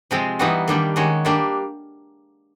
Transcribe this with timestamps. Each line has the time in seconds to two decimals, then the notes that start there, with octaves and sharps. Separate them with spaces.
0.11 C3 F3 G#3 C4
0.39 E3 G3 B3 D#4 F#4
0.68 D#3 G3 A#3 D4 G4
0.96 D#3 G#3 C#4 F#4
1.25 G3 A#3 D4 G4